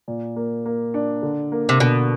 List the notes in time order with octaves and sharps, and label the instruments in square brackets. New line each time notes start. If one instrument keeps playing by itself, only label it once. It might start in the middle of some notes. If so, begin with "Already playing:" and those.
[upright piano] A#2
A#3
A#3
D4
D3
A#3
[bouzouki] C3
[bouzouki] B2 [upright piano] D3